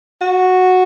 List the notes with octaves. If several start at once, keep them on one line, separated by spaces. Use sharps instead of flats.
F#4